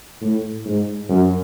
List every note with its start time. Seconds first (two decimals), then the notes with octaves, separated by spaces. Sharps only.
0.21 A2
0.65 G#2
1.09 F#2